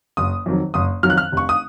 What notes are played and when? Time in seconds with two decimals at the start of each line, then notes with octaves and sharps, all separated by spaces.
0.17 F#1 D#6
0.46 F2 D#3 F#3
0.74 F#1 D#6
1.03 F2 D#3 F#3 F6
1.10 F#6
1.18 F6
1.32 F1 C#6
1.49 D#6